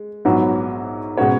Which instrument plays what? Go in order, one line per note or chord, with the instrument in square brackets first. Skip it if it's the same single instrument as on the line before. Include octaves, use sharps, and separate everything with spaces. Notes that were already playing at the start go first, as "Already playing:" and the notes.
Already playing: [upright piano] G#3
A#1 G#2 F#3 B3 F#4
B2 G#3 C#4 F#4 C#5